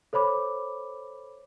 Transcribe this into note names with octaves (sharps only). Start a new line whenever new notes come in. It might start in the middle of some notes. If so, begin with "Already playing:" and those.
A4 C5 C#5 B5 D6